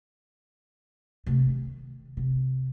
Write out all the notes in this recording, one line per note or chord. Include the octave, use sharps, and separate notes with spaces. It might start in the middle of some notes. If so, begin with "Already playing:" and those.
C3 A3
D#3
C3